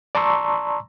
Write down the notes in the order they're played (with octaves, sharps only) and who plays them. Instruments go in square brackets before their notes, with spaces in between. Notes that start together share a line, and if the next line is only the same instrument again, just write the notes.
[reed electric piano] D5 A5 A#5 C6 C#6 E6